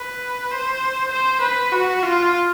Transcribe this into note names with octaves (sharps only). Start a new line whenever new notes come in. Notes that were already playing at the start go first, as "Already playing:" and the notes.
Already playing: B4
C5
C5
B4
F#4
F4